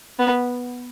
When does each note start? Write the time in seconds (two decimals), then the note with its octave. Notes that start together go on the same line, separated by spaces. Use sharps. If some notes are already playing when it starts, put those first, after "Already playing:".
0.19 B3